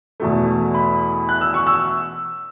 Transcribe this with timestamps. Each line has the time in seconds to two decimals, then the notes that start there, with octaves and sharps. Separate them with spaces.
0.20 E2 B2 A3
0.74 B5
1.29 F#6
1.41 E6
1.54 C#6
1.67 E6